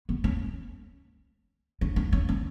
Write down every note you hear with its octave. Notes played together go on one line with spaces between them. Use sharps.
B3
C#4
D4
D4
C#4
C#4